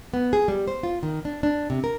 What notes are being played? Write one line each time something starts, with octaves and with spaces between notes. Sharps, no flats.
B3
G#4
G3
C5
F4
D#3
D4
D4
C3
A#4